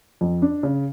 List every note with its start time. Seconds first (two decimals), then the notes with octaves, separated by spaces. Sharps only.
0.21 F2
0.42 D4
0.63 C#3